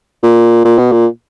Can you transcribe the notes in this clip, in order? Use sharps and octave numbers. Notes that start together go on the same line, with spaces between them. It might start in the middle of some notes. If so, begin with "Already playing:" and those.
A#2
A#2
B2
A#2